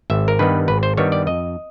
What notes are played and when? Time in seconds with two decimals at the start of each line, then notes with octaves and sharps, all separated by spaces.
0.10 G#1 E5
0.28 A#4
0.39 G2 D#3 G3 B3 B4
0.68 G#1 B4
0.83 C5
0.97 G2 D#3 G3 B3 C#5
1.12 D5
1.27 F2 D#5